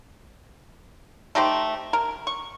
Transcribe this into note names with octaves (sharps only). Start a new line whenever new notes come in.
A3 D#4 G4 C5
A#4
C#6